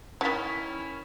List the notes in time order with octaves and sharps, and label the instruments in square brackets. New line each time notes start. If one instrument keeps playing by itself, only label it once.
[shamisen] D3 D#3 [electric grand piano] C#4 B6 [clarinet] E4